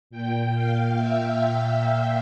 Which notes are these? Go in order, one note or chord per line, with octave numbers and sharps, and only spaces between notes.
A#2 G5
F5
E5